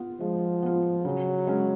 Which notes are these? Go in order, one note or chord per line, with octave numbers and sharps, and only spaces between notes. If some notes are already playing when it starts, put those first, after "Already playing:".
Already playing: B3 F4
F3 G#3
B3 F4
C#3 F#3
G#3 C#4